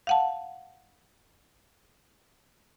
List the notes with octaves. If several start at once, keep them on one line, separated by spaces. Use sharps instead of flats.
F5 F#5 A5